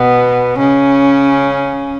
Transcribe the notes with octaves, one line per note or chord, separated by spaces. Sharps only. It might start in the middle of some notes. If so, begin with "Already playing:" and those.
Already playing: B2 B3
C#3 C#4